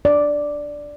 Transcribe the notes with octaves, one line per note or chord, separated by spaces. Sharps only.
D5